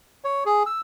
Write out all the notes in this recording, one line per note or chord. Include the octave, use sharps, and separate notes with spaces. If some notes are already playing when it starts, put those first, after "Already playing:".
C#5
G#4
E6